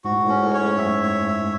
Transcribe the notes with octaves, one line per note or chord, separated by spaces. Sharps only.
G#2 F#4
A2
G#2
A2 C#4
G#2
A2
G#2
A2 C#5
G#2
F#2 E5
C#5
E5